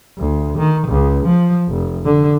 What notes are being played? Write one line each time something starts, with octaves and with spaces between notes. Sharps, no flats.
D2
D#3
C#2
F3
F1
D3